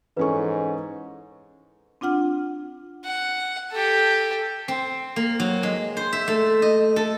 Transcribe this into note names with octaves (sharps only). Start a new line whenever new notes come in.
G#2 E3 C#4 A4 B4 C#6
C4 D4 F4 F#5 F6
F#5
G4 A4
C4
A#3
F#3
G#3
C5
E5
A3
D#5
A4